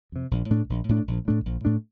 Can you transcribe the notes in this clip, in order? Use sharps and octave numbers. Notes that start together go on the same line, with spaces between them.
F2 C3
A#1
A2 A3 D4
A#1
A2 A3 D4
A#1
A2 A3 D4
A#1
A2 A3 D4